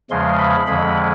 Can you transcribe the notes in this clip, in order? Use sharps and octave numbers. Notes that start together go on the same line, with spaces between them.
E2 C#3 F3 G#3 C6
B5
F2 D3 F3 G#3 B5